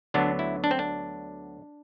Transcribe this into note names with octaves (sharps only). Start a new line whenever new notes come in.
D2 D3 F#3 B3 D4
E4
D4
C4
D4